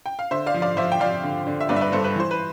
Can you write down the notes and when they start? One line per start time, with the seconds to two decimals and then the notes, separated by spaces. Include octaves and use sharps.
0.06 G5
0.19 F5
0.31 D3 C5 E5
0.46 D5 F5
0.54 F3
0.62 D5 F5
0.77 F3 C5 E5
0.92 G5
1.00 F3 D5 F5
1.23 D3
1.47 D3
1.60 E5
1.69 G2 B4 D5
1.76 E5
1.81 B4 D5
1.92 G2 A4 C5
2.04 B4
2.16 E3 C5
2.31 B4